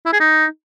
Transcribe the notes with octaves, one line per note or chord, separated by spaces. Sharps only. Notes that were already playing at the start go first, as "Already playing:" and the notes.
E4
G#4
D#4